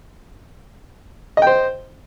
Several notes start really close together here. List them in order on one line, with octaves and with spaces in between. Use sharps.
D#5 G5 C5